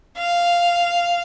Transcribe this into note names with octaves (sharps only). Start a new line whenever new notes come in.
F5